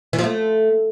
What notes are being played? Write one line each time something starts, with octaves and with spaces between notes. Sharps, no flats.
E3
F3
A3